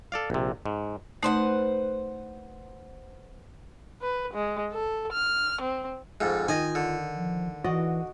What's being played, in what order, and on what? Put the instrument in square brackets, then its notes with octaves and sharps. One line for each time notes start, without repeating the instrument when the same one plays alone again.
[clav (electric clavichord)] A4 D5 F5
A#1 C3
G#2
[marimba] A3 D#4 [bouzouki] B4 C5 F#5
[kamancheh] B4
G#3
A4
F6
C4
[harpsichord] F2 G#2
[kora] D#3 [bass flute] F4 [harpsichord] D#5 G#5
[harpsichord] D3
[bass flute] F3
[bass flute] E3 [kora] F#4 D5 D#5